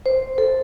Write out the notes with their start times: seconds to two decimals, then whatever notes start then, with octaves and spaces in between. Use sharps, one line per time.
0.06 C5
0.38 A4